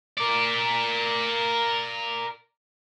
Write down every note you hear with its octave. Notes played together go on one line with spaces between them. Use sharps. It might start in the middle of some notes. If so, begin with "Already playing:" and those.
A#4 D5